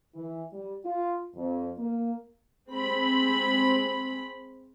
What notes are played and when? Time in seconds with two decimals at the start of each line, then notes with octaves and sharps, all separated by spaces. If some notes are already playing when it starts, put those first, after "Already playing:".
0.15 E3
0.53 G3
0.84 F4
1.35 F2
1.78 A#3
2.70 G#3 C4 B5